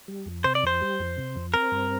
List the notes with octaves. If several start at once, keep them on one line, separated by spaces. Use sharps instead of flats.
G3
F2
C3 C5
D5
F2 C5
G3
F2
C3
F2
C4 A#4
G2